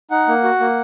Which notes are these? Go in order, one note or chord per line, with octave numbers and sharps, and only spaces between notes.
D#4 F#5
A#3
F#4
A#3